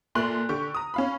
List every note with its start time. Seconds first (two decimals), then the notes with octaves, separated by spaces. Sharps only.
0.15 A#2 A3 C6 F#6 F#7
0.49 D3 G4 C#6
0.75 A#5 D#6
0.94 C#4 F5 B5